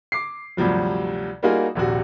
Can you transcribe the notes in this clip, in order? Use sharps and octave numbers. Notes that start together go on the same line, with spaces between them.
D6 C7
D2 G2 C3 F3 F#3
G3 A#3 D#4 F4 F#4 G#4
D#1 A#1 C3 F#4